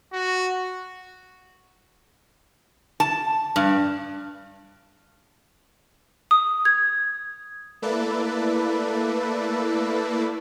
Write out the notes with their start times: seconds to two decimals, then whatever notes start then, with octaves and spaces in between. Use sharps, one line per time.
0.13 F#4
3.00 A5
3.56 G2
6.31 D#6
6.65 G#6
7.82 A3 A#3 E4 A4 B4 D5